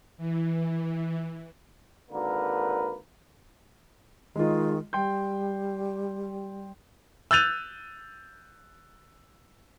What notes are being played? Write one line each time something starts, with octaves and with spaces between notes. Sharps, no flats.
E3
G#1 D3 A#3 A#4 B4
D#3 G#3 F4
G3 G5 C6 G6
E6 F#6 G6 A6 D#7 F7